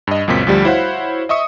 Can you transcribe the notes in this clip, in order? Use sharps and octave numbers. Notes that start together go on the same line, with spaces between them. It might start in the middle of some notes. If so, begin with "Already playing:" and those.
G2 D#5
C#2 F#2 A#2 C4 B6
D2 F3 G3 G4
E4 F#4 C5 C#5 F5 F#5
D#5 E5 C#6 D#6 C#7